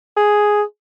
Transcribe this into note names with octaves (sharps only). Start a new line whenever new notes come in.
G#4